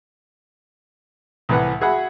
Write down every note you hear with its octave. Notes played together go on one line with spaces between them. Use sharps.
C2 A2 E3 B4 F#5
F#4 G#4 E5 F#5 B5